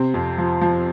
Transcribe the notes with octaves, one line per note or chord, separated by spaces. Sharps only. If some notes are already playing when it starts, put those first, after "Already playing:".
Already playing: C3 C4
F2
F3
F3